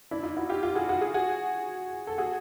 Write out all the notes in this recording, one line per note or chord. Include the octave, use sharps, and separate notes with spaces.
D4 E4
D#4 F4
E4 F#4
F4 G4
F4 G4
F#4 G#4
F#4 G#4
F#4 G#4
F#4 G#4
A4
F#4 G#4